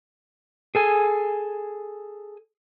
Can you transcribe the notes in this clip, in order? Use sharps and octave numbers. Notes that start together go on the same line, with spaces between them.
G#4 A4 G#5